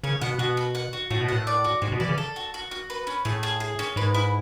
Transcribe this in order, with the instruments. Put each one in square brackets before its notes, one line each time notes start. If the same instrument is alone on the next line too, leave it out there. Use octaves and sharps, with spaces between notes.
[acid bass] C#3 [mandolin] C#5
[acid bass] B2 [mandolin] F#5
[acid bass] B2 [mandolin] F#4
[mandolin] F#4
F#5
F#4
[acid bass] A2 [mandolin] F#4
[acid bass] B2
[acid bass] A2 [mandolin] F#5
[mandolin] D5
F#4
[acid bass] G#2 [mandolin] F#4
[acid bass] B2
[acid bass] E3 [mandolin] D5
[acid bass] C#3
[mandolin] A4
F#4
F#4
F#4
B4
C#4
[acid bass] A2 [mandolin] G#4
[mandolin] G#4
G#4
C#4
[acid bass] G#2 [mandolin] B4
[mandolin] E4